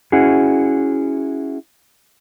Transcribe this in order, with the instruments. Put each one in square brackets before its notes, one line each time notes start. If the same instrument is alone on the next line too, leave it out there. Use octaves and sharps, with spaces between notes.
[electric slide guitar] C#4 E4 F#4 G#4